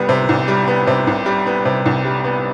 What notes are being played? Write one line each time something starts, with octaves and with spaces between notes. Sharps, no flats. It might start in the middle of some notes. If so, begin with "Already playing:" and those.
Already playing: C2 G3 B3
C3
C2
G3
B3
C3
C2
G3
B3
C3
C2
G3
B3